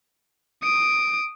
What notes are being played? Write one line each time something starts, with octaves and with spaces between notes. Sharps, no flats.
D#6 D7